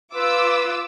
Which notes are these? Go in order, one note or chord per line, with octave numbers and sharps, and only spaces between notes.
F4 B4 D6 E6